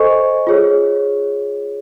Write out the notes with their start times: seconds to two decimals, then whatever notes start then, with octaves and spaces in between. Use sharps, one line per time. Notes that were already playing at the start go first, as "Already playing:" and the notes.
Already playing: A4 C5 D#5 G#5 C#6
0.47 F4 G#4 C#5